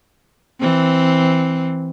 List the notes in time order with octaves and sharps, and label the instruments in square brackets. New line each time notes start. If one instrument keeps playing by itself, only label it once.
[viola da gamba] E3 C4